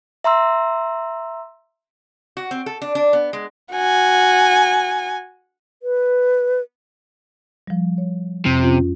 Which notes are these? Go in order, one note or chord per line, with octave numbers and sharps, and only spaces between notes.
E5 A#5 C6 E6
F#4
C4
A4
D4
D4
B3
G#3
F#4 G#5
B4
F3 G3
C#5
F2 C3
C#4 F4